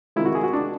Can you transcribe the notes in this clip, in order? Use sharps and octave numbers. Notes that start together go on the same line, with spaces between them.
C3 D#3 G#3 E4
F#4
G#4
F#4
D4